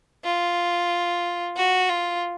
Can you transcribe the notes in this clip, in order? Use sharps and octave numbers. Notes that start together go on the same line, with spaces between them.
F4
F#4
F4